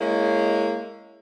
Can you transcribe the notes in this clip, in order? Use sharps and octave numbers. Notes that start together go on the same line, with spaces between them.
G#3 A#3 C#4 E4 D#5